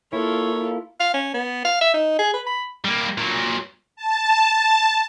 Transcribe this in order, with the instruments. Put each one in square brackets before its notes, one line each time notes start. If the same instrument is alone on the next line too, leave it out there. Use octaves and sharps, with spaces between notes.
[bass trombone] A#3 [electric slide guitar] E4 [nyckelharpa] F4 A4 [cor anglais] C#5
[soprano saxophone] F5
C#4
B3
F5
E5
D#4
G#4
B4
B5
[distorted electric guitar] G3 A#3
A#2 F#3
[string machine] A5